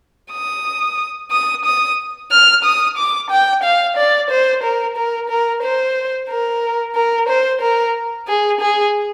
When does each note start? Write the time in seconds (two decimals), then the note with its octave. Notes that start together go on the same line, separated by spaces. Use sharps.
0.32 D#6
1.31 D#6
1.65 D#6
2.31 F6
2.64 D#6
2.98 D6
3.30 G5
3.64 F5
3.97 D5
4.30 C5
4.63 A#4
4.97 A#4
5.30 A#4
5.63 C5
6.29 A#4
6.95 A#4
7.29 C5
7.62 A#4
8.28 G#4
8.61 G#4